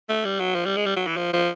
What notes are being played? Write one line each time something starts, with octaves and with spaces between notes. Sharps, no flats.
A3
G3
F#3
F3
G3
G#3
G3
F#3
E3
F3
F3